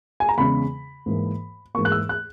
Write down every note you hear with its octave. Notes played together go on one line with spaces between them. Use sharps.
G#5
A#5
E2 C#3 G#3 B5
G#2 E3 A#3
G#2 E3 A#3 C#6
F#6
E6
F#6